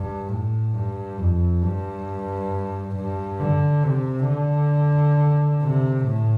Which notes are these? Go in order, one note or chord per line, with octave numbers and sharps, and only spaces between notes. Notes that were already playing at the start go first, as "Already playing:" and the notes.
Already playing: G2
A2
G2
F2
G2
G2
D3
C3
D3
C3
A2